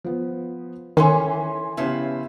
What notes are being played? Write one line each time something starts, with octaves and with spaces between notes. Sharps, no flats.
F3 B3
D#3 E3 C#4 A4 C#5 C6
C#3 F3 B3 C#4 E4 G4